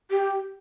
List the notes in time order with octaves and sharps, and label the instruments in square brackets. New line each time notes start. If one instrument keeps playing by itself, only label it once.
[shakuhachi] G4